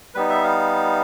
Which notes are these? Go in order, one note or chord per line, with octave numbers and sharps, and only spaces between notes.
G3 B3 D#4 B4
E5
F5